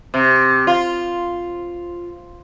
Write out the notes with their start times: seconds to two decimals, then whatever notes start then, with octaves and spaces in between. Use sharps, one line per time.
0.14 C3
0.67 F4